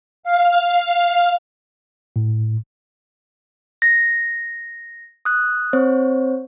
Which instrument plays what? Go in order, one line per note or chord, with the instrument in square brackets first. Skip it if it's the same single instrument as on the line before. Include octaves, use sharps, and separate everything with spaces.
[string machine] F5
[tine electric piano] A2
[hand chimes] A#6
D#6 F#6
C4 C5 C#5